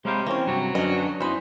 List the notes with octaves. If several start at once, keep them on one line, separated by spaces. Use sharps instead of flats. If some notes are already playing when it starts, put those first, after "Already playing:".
C3 G#3 C#5 F5 G5 A#5 B5
E3 A#3 C4 C#4 C5 C#5 G5 A#5
G2 C3 F#3
F#2 D3 C#4 D4 B4 D#5
F#2 B3 D#4 E4 C5 G#5 B5 C6